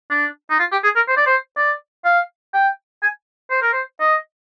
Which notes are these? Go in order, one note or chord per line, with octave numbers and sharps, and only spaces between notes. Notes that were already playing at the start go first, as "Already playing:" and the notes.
D4
D#4
F4
G4
G#4
A#4
C5
D5
C5
D5
F5
G5
G#5
C5
A#4
C5
D#5